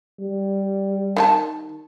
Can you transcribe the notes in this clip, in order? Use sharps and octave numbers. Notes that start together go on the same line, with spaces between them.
G3
D#3 F4 A5